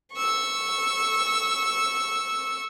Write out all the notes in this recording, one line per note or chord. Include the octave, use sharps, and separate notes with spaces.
C#6 E6